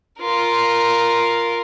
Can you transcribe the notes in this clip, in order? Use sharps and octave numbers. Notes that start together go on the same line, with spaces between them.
F4 A#4